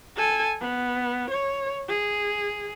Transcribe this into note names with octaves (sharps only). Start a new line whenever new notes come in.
A4 G#5
B3
C#5
G#4